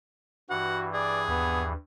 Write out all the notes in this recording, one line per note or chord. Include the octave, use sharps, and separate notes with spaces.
G2 E3 F#4 F#5
G#4 D5
D#2 B3